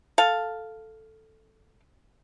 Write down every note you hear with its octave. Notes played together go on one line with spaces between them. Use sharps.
A4 F5